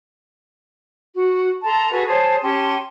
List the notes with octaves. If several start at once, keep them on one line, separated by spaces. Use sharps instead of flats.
F#4
A4 A5 A#5 C6
F#4 G#4 A4 B4
G#4 C5 C#5 A5
C#4 G4 A5 C6